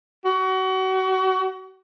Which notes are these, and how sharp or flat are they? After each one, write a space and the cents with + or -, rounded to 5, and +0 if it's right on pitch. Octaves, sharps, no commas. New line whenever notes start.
F#4 +30